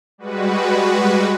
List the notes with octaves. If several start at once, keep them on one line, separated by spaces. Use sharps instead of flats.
G3 G#3 F#4 B4